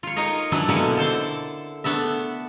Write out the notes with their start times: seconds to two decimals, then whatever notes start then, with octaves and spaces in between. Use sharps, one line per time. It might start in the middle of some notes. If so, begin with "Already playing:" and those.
0.03 F4 C#5
0.16 D#4 A#4 C#5 D#5
0.52 E3 F#3 D4 E4 G#5
0.69 B2 D3 A#3 B3 C#4 E4
0.97 A4 C5 D5 A5
1.84 A3 B3 D4 E5